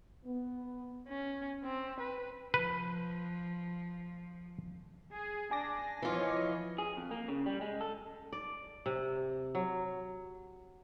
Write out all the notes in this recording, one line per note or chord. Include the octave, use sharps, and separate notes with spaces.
B3
C#4
C4
B4
F3 B4
G#4
D4 G#5 D6 A#6
E3 F3 F4 C#5 D#5
G#4
F2
A#3
C#3
G3
G#3
A4
D5
C3
F#3